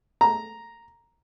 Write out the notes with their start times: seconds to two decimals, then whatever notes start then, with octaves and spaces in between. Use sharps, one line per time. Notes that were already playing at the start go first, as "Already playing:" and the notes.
0.21 A#5